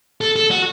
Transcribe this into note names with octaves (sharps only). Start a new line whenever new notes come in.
A4
A4
F#4